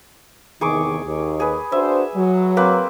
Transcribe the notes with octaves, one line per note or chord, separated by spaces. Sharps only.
E2 C3 D#3 G#4 C#6 D6
D#2
G#4 B4
D4 F#4 C5 E5
F#3
A#3 C4 B4